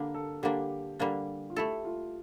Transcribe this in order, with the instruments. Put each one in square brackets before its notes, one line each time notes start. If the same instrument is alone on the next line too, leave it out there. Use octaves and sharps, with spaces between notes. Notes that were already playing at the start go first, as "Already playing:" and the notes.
Already playing: [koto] D3 G3 A#3 D4 [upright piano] A#4
[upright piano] A4
[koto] D3 G3 A#3 D4 [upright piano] G4
[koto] D3 G3 A#3 D4
[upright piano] F4
[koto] A3 E4 A4 [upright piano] G4
[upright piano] F4